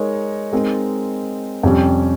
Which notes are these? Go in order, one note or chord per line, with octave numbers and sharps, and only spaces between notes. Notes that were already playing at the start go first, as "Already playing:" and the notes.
Already playing: G#3 D#4 A#4 C#5
G#3 C4 D#4 A#4
F2 C3 G3 C#4 G4